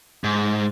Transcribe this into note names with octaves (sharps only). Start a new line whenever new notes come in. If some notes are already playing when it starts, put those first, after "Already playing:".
G#2